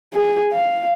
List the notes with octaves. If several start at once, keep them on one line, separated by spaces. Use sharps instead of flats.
G#4
F5